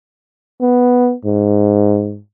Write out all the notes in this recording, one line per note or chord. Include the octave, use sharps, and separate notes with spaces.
B3
G#2